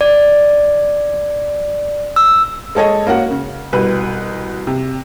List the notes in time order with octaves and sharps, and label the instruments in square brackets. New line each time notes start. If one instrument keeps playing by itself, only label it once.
[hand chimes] D5
E6
[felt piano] G#3 A4 C#5 D#5
A#3 C#4 F#4 F#5
C#3
C2 B2 B4
C3